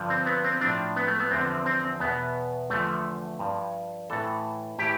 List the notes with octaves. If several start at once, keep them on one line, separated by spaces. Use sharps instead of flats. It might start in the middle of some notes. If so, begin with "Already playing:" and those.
Already playing: G2 D3 F3
C4
B3
C4
A2 F3 D4
B3
A3
B3
E2 D3 F3 C4
C4
E2 B2 B3
E2 D3 F3 A3
G2 F3
A2 E3 A4
A2 E3 G4